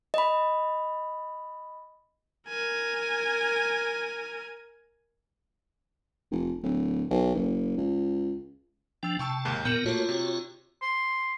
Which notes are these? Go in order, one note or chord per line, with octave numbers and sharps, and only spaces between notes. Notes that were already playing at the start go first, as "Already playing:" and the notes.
D#5 B5
A#4 G#5
F1
D1
B1
F#1
C#2
F3 D4 G5 E6
C3 G5 A5 C#6 E6
D#2 G#2 D#3
A#2 B3 A#4 G6 C#7 E7
A3 A#3 F4 F#4 C#5
C3
C6